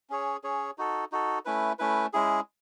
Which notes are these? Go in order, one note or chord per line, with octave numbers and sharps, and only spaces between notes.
C#4 G#4 C#5
C#4 G#4 C#5
D#4 F#4 A4
D#4 F#4 A4
A3 C#4 E4 B4
A3 C#4 E4 B4
G#3 C#4 E4 G#4